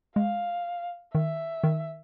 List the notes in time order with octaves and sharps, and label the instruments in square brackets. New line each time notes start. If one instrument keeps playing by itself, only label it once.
[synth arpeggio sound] G#3 [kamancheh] F5
[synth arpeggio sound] D#3 [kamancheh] E5
[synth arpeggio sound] D#3